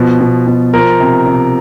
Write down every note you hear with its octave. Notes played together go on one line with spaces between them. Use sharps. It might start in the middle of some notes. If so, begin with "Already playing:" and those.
Already playing: B2 F3
B2
B2
F3 A#4
C3
C3